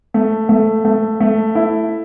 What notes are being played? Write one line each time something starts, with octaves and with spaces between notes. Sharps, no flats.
A3
A3
A3
A3
E4